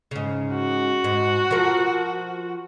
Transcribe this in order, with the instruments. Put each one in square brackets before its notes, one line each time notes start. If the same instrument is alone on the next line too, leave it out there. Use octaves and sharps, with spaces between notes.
[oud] G#2 C#3
[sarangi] F#4
[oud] G#2
F3 A#4